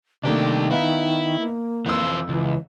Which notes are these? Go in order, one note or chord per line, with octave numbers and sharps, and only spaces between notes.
C2 D#3 A3 A#3 D4 G4
B3 D#4 E4 F5
A#3
F2 E3 F4 E6
C#2 E3